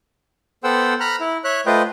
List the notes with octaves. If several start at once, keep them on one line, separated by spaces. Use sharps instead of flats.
B3 A4 C5 F#5 G5 E6
A#5 B5 F6 F#6
E4
C#5 E5 F#6
A3 F4 B4 C5 D#5 G5